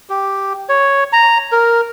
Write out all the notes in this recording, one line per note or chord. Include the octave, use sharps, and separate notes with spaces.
G4
C#5
A#5
A#4